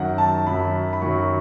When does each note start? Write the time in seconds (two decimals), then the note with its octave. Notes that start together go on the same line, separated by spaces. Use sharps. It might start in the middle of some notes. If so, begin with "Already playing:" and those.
Already playing: F#2 D#3 F#3 F#5
0.18 A5
0.46 F#2 D#3 F#3 B5
0.93 B5
1.02 F#2 D#3 F#3 C#6